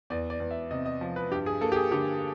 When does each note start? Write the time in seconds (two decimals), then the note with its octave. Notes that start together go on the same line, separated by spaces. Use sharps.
0.10 E2 D5
0.30 D5
0.40 E2
0.51 E5
0.71 C3 D#5
0.86 D#5
1.01 F3
1.16 B4
1.31 G2 G4
1.46 G#4
1.61 A#3 A4
1.72 G4
1.76 G#4
1.91 D3 G4